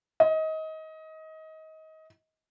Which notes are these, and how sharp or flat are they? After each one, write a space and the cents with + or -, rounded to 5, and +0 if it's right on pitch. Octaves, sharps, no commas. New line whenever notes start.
D#5 +25